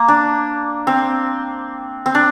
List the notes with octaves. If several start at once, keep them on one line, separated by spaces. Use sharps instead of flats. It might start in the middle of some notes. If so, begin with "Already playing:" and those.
Already playing: A#3
D4
C4
C4
D4